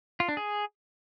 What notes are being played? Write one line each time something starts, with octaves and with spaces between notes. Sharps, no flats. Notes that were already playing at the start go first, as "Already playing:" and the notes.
F4
D4
G#4